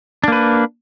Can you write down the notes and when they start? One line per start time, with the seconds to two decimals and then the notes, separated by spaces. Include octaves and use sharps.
0.24 D4
0.28 A#3
0.32 B4